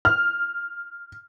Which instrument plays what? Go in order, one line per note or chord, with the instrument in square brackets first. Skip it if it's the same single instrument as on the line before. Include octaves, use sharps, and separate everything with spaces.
[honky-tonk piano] F6